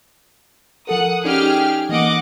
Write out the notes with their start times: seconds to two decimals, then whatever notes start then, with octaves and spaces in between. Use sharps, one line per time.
0.87 F3 A4 A#4 F#5 D#6
1.25 C#4 D#4 G4 G#4 D5 F6
1.89 E3 A#3 D#5 F#5 D6